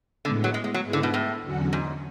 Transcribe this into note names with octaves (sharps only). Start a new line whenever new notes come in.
A2 D3 G#3 B3
F#3
G#3
G#3
F#3
G#2 G#3 B3 E4
D3
B2
A2
E2 D3 F#3 C#4 F#4
G#2